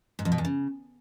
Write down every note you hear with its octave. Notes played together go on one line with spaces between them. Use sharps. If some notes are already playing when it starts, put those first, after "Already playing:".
G#2
F2
B2
E2
C#3